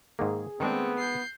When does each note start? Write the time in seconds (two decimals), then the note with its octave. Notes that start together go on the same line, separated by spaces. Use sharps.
0.19 G#2 D#3 A#3 G#4
0.60 D#3 G#3 A3 B3 C4 D4
0.99 G6 C7